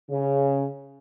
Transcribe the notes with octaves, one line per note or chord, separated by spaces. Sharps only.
C#3